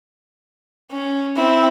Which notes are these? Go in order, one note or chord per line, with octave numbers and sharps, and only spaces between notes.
C#4
C4 E4